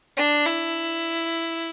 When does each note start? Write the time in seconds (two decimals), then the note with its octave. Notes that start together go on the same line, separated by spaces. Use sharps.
0.17 D4
0.46 E4